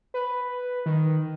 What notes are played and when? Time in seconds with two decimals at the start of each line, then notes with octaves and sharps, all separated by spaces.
0.14 B4
0.86 D#3